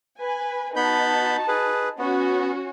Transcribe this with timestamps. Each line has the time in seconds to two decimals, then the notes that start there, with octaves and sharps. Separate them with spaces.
0.19 B4 G#5
0.76 B3 D#4 F#4 A5 B5 G6
1.48 G#4 B4
1.99 B3 C#4 F#4